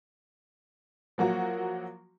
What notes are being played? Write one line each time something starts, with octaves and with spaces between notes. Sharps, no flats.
F3 F#3 A#3 F#4